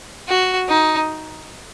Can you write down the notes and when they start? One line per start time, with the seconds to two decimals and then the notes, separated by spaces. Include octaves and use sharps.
0.28 F#4
0.68 D#4